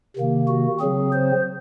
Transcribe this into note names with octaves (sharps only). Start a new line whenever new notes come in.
C3 D#3 A#3
F#4
C#3 F#3 C4 G#4
C5